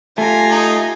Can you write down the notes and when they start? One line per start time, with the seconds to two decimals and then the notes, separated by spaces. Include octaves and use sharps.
0.18 A3 F4 G4 G#5 A#5
0.51 D#4